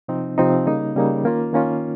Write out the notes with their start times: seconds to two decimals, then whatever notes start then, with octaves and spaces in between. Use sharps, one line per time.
0.08 C3 F3 C4 D#4
0.38 C3 F3 C4 D#4
0.66 C#3 G3 A#3 D#4
0.96 C#3 G3 A#3 D#4
1.24 D#3 A#3 C#4 F4
1.53 D#3 A#3 C#4 F4